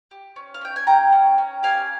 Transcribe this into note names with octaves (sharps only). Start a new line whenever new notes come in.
G4
C#4
F5
C#4 G5
G#5
G4 G5 A#5
C#4
C#4
G4 F5 G#5